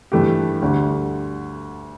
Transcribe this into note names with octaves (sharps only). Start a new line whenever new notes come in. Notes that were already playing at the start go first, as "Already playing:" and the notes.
G2 E3 A3 G4
D2 D3 G3